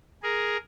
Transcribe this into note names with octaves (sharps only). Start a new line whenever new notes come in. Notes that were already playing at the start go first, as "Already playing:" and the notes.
G#4 A#4